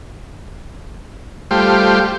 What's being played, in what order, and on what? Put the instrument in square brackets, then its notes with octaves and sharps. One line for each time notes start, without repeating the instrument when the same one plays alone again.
[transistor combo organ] G3 A3 F4 G4 C5